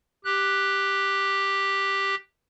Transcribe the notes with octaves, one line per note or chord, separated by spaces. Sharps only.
G4 F#6